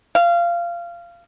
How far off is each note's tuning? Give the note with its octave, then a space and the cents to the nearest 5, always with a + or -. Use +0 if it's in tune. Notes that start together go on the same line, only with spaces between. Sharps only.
F5 -20